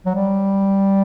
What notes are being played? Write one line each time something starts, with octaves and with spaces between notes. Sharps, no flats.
F#3
G3